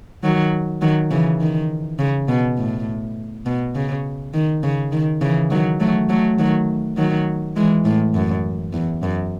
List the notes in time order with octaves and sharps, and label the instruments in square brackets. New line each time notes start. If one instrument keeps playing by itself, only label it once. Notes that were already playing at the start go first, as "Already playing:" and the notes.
[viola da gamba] D#3 F#3
D#3 F#3
C#3 E3
D#3
C#3
B2
A2
B2
C#3
D#3
C#3
D#3
C#3 E3
D#3 F#3
F#3 A3
F#3 A3
D#3 F#3
D#3 F#3
E3 G#3
A2
F#2
E2
F#2